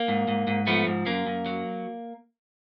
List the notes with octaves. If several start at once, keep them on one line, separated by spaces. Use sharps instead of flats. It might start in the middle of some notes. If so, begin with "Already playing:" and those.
Already playing: A#3
G#2
G#2
G#2
F3 A3 B3
G#2
F#2 A#3
F#2
F#3